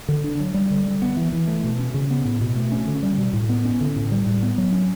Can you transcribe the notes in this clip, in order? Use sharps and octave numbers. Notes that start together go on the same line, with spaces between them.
D3
D4
F#3
G3
D3
G3
B3
E3
E3
A3
B2
C#4
C#3
B3
A2
B2
A3
C#4
D3
G3
B2
A2
B3
C#4
D3
A2
G3
A2
B3
F#3
C#4